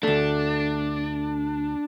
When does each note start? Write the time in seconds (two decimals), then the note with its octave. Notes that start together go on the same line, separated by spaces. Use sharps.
0.03 D2 A3 D4